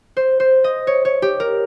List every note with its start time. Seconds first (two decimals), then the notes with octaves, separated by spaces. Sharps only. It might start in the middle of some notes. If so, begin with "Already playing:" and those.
0.17 C5
0.40 C5
0.64 D#5
0.87 C#5
1.05 C#5
1.22 G4
1.40 A#4